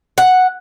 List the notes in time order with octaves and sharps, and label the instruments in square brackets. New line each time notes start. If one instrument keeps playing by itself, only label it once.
[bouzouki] F#5